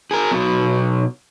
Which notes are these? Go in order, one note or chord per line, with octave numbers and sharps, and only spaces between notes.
G#4 A#4
B1 B2